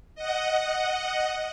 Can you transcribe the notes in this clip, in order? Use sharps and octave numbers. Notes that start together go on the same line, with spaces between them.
D#5 F#5